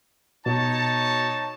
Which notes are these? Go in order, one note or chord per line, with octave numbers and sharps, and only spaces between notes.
B2 D#4 C#5 A5